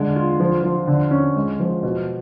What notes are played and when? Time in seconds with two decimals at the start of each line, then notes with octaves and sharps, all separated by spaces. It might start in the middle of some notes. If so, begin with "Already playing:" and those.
Already playing: D3 G#3
0.16 F4
0.40 F3
0.63 F3
0.87 D3
1.11 C#4
1.36 G#3
1.60 F3
1.83 B2